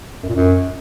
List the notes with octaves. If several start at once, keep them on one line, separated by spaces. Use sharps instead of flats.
F#2
A#2
F#2